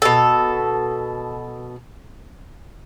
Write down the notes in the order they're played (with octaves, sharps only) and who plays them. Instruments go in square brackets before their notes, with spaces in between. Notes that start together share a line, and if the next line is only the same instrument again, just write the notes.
[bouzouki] B2 A4